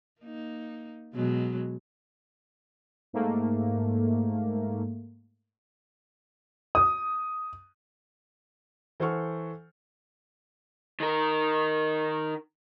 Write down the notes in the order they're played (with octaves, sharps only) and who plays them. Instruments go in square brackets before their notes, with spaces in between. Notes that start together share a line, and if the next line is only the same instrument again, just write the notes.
[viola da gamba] A#3 D#4
B2 F#3 G#3
[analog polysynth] G#2 A3 A#3
[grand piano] D#6
[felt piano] E3 A4 C5 F#5 C#6 F6
[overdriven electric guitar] D#3 A#4